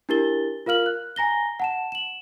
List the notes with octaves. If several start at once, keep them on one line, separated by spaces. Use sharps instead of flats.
D4 E4 G4 A#4 A6 G7
F4 A#4 F5 F6 F#7
F#6
G#5 A#5 A#6 G7
F#5 A5 E7
E7 F#7